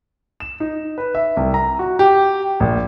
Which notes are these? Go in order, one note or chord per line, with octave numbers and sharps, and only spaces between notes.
E7
D#4
B4
E5
C2
A#5
F#4
G4
A#1